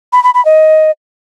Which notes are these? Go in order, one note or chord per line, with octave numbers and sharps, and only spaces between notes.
B5
B5
B5
D#5